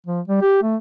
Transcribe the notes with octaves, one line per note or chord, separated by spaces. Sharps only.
F3
G3
G4
A3